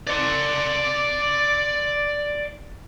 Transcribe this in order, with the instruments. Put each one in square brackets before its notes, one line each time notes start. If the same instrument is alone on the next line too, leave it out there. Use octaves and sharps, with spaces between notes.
[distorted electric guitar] D5 C6